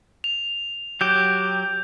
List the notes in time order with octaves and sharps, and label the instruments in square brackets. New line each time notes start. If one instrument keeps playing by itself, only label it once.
[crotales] F7
[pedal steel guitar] F#3 G4 [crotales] G6